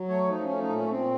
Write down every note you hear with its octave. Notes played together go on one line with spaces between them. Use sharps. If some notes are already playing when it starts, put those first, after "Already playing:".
Already playing: F#3
A3 C#5
F3 D#4
A3 C#4
D#4
A#2 C#4
A#2 C4